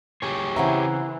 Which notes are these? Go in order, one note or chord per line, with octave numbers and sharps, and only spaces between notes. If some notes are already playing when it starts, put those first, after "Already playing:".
G4 G#4 C#5
C#3 E3 C4 E5 F#5 A#5